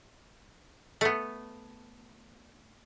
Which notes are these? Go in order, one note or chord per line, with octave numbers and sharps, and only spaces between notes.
A3 B3